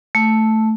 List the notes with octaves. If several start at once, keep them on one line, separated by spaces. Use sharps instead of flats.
A3